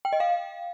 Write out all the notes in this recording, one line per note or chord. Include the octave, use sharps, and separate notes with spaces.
G5
D#5
F5